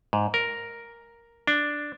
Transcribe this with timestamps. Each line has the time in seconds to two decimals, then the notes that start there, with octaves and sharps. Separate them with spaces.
0.13 G#2
0.34 A#4
1.47 D4